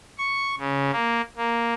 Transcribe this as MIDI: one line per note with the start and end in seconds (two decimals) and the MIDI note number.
0.18 0.55 85
0.58 0.91 49
0.92 1.21 58
1.37 1.74 58